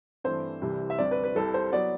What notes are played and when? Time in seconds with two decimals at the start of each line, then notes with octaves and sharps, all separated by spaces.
0.24 G2 E3 A3 C4 C5
0.62 C2 C3 E3 G3
0.90 E5
0.98 D2 C3 G3 C4 D5
1.11 B4
1.24 B4
1.35 C2 C3 G3 A4
1.54 C5
1.72 F#3 B3 D5